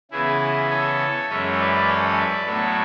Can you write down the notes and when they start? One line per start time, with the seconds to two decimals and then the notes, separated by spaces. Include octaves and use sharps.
0.11 C#3 E3 B3 E4 G#4
0.70 A4 C#5
1.29 F#2 E3 G#3 C#4 C#5 E5
1.58 B4 D5
1.87 A4 C#5
2.17 B4 D5
2.46 A2 F#3 B3 D4 A4 C#5